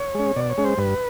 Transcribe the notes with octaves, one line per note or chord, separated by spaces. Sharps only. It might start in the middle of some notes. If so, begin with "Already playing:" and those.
Already playing: C#5
G#3 C#4
B2 D5
C#5
G#3 C#4
C5
G2 B4